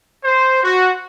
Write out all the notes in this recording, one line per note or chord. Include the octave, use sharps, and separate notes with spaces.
C5
F#4